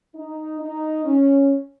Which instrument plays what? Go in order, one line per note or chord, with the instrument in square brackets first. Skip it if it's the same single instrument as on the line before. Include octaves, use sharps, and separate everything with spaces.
[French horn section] D#4
D#4
C#4